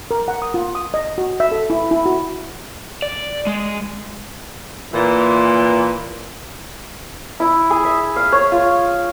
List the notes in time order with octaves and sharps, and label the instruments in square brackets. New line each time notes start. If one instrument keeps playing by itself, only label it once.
[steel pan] A#4
F#5
D#6
F4
D#6
D#5
F#4
E5
A4
E4
E4
F#4
[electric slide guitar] D5
G#3
[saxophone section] A#2 E3
[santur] E4
G#4
E5
F5
C#5
F4